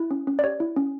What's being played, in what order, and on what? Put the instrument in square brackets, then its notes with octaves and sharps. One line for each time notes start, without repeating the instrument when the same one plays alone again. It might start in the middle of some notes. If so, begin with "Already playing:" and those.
Already playing: [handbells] E4
C#4
C#4
D5
G4 C#5
E4
C#4